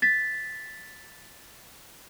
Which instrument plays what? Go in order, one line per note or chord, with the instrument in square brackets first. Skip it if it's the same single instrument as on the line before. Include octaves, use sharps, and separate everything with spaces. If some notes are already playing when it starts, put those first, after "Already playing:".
[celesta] A6 B6